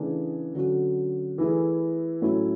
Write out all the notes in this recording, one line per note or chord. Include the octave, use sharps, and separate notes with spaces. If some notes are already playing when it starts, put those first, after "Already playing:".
Already playing: C#3 E3 A3 D4 G#4
D3 F#3 C#4 F#4
E3 A3 E4 G#4
A2 F#3 C#4 E4